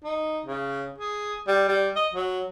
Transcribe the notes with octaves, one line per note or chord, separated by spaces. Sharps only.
D#4
C#3
G#4
G3
G3
D#5
F#3